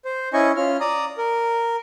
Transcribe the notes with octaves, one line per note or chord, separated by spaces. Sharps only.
C5
C#4 E4 D#5 G#5 C#6
C#4 F4 F6
D5 A#5 D#6
A#4